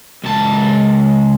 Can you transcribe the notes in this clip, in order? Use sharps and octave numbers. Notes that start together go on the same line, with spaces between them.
C#2 A5